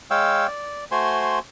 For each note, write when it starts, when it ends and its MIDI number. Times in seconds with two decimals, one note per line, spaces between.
0.11 0.47 56
0.11 0.47 73
0.11 0.47 77
0.11 0.47 79
0.11 0.47 88
0.47 0.85 74
0.91 1.39 57
0.91 1.39 66
0.91 1.39 72
0.91 1.39 80
0.91 1.39 84